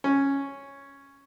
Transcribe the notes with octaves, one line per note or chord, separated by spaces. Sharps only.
C#4